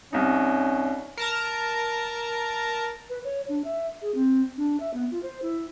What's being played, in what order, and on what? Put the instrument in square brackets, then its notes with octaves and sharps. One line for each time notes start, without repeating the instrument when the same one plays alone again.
[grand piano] C2 D#4 [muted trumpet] C#4
[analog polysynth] A#4 A5 A#5
[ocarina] B4
C#5
D4
E5
G#4
C4
D4
E5
B3
F4
C5
E4